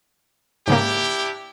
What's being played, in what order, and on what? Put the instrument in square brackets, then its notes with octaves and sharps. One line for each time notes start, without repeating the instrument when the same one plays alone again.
[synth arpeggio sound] G#2 C#3 A#3 [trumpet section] D4 E4 G4